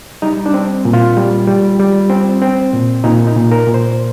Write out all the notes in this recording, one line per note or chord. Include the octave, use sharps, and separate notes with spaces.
G3 D#4
D4
C4
A#2
F4
G3
G3
G3
C4
C4
A#2
A#2 D#4
D#4
A#2
A#4
A#2
C5